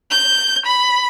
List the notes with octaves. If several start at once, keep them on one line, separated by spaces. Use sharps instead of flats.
G6
B5